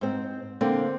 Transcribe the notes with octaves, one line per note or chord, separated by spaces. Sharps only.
G#2 C4
D3 A#3 C4